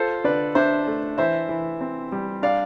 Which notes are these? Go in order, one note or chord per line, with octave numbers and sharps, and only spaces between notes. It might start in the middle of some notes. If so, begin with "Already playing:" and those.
Already playing: F4 A4 C5
D3 B4 D5
D4 C5 E5
A3
E3 C5 E5
E3
C4
G3
D4 D5 F5